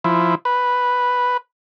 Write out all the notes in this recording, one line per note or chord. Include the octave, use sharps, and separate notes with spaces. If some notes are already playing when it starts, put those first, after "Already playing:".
F3 E4
B4